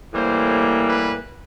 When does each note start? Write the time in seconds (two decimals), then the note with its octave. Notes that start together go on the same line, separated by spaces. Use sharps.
0.13 A2 E3 G3 A#3 C5
0.87 B4